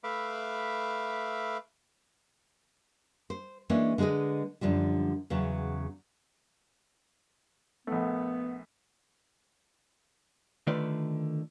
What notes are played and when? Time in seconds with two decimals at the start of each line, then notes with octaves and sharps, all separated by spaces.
0.04 A3 B4 E5 F5 B5 D6
3.30 C5
3.70 E3 G#3 A#3 C#4 D4
3.98 D3 G#3 G#4 B4 D#5
4.61 F#2 D3 F3 G3
5.30 E2 C#3 F#3
7.87 A#1 A3 B3
10.67 D3 D#3 A3 F4 B4 D5